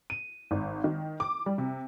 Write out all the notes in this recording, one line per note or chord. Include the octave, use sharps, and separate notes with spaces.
D#7
G#1
D#3
D6
G3
C3